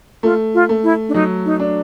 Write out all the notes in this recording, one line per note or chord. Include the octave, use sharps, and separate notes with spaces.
A3 F4
F4
A3
E4
D4
F#3 D#4
D#4
D4